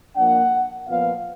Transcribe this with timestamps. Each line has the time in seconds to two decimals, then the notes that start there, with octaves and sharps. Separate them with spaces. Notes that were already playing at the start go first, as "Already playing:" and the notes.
0.16 A#2 F3 A#3 D4 F#5
0.87 A#2 F3 B3 F5